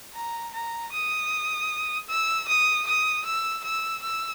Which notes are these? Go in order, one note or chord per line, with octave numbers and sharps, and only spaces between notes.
A#5
A#5
D#6
E6
D#6
D#6
E6
E6
E6